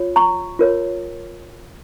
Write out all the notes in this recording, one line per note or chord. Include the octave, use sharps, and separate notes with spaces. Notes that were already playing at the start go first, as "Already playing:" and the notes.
Already playing: F4 C#5
A#5 C#6
F4 A#4 C#5